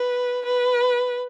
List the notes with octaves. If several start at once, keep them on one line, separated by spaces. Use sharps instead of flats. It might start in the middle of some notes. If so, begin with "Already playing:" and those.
Already playing: B4
B4